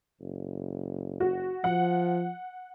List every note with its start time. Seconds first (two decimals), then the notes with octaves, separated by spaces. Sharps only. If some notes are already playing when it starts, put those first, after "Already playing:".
0.20 F#1
1.20 F#4
1.64 F3 F#5